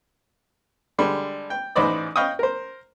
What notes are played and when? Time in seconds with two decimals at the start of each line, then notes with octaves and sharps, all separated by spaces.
0.99 D3 G3 G#3
1.50 G5
1.76 A1 G#2 B4 C5 D5 D#5
2.16 D#5 F5 G5 B5 C#6 D#6
2.39 A#4 C5